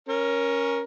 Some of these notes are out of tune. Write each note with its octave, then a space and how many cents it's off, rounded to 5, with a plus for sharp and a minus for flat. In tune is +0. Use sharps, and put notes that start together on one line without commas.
C#4 +0 A#4 +15